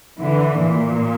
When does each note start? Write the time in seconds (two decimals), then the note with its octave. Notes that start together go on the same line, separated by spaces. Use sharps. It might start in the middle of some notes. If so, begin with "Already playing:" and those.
0.20 D3 E3
0.59 A#2